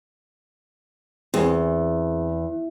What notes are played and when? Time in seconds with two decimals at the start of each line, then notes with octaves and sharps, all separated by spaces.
1.34 E2 C4 G#4